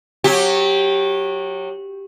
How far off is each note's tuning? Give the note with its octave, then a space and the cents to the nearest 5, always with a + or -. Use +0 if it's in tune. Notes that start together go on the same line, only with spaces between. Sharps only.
F#3 -20 G4 +0